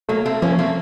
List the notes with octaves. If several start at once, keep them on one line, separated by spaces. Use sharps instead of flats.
F#3 A3 A#3
A3 C4
F3 A#3 C#4
A3 C4